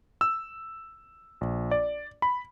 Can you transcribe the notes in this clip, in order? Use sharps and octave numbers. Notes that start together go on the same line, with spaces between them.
E6
A#1
D5
B5